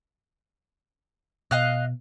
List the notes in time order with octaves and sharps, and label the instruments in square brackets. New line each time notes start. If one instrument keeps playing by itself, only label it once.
[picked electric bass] B2 [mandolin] D#5 F5 F#6